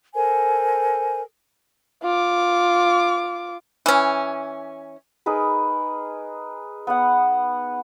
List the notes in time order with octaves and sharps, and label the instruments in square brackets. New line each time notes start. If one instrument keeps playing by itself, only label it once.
[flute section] A4 A#4 C5 G#5
[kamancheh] F4 D6
[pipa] E3 C#4
[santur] D#4 G#4 A#4 B4
B3 F#5